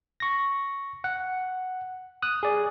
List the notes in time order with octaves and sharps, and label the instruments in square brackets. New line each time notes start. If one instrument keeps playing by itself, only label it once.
[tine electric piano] C#6 A#6
F#5
D#6 F#6
G#4 D5